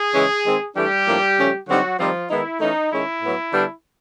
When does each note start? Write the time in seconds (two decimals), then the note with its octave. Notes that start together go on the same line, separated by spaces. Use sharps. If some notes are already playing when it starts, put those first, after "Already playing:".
Already playing: G#4
0.14 C#3 E3 G#3 C#4
0.44 D#3 G#3 C4
0.76 E3 G3 A3 D4 G4
1.07 A2 F3 A#3 D4
1.37 C#3 F3 A3 C#4
1.68 D3 F#3 G3 C4 D#4 F#4
1.99 D#3 F3 G3 C4 D#4 F4
2.29 D#3 G#3 B3 D#4 E4
2.60 E3 A3 C#4 D#4
2.91 D#3 G#3 C#4 E4
3.22 A2 F#3 B3
3.53 D3 G3 B3 D4